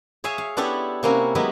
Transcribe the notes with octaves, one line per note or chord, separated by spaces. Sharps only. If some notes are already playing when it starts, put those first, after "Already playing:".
G#4 C#5 E5 F5 G#5
F5
B3 D4 E4 G4 A4 C#5
C3 A#3 C#4 E4 F#4
F#3 G#3 B3 E4 G4